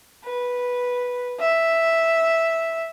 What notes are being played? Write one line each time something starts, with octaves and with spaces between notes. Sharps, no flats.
B4
E5